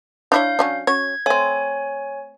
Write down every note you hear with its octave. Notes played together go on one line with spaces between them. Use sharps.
D4 E4 C#5 F5 G6
F#3 C#4 D4
C#4 F#4 C#5 G#6
A3 C4 C#5 G#5